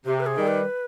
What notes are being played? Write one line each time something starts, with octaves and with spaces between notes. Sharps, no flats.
C3 G4
B4
G#4
D#3 G3
B4